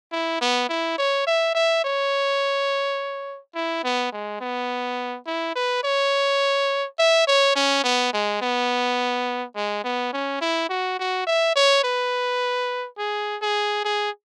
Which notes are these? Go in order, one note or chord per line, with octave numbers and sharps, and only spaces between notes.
E4
B3
E4
C#5
E5
E5
C#5
E4
B3
G#3
B3
E4
B4
C#5
E5
C#5
C#4
B3
G#3
B3
G#3
B3
C#4
E4
F#4
F#4
E5
C#5
B4
G#4
G#4
G#4